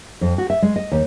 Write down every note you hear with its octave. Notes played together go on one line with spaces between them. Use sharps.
F2
F#4
E5
G#3
D#5
D#2